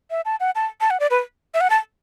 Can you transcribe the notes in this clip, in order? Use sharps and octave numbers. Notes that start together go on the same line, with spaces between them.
E5
A5
F#5
A5
A5
F#5
D5
B4
E5
F#5
A5